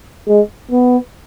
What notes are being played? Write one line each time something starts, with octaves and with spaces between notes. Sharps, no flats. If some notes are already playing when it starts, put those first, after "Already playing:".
G#3
B3